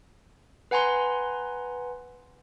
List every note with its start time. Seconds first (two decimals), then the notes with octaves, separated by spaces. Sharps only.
0.71 B4 F#5 G#5 A#5 C6